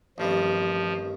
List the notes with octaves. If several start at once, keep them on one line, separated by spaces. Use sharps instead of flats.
A1 G2 D#3 F3 G3 C4